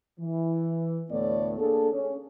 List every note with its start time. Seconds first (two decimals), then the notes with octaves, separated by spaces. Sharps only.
0.20 E3
1.11 D2 A2 A3 B3 C#5 D5
1.58 A#3 D4 G#4 A4
1.92 C#4